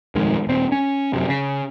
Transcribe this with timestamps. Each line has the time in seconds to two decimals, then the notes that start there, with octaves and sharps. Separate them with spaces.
0.15 D#1 F2 D#3 G#3
0.47 D#1 C4
0.72 C#4
1.13 F1 F#2 C3
1.29 C#3